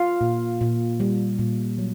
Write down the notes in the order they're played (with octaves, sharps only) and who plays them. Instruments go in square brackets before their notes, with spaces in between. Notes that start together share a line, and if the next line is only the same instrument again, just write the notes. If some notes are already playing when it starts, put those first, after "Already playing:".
Already playing: [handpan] F4 F5
A#2
A#2
G3
A#2
F#3